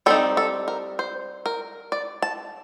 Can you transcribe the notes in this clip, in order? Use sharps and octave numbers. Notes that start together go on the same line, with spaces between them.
G3 C4 D#4 A4
A4
A#4
C5
A#4
D5
A5